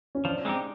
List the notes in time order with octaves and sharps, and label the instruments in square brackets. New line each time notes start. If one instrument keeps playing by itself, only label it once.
[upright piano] C#4
[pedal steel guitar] F3 [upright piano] D4
[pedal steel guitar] G#3 C4 D#4 G4